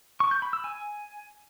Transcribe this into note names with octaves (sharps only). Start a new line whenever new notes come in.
C#6
G6
B5
E6
G#5